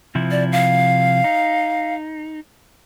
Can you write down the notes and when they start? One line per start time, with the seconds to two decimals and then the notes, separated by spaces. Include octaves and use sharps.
0.15 C3 F3 E4
0.31 D5
0.52 F5
1.24 D#4